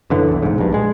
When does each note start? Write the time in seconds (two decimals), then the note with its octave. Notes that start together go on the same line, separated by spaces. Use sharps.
0.10 F#2 D3 E3
0.28 B1 E2
0.43 B1 G#2
0.58 A#1 G2
0.74 G#3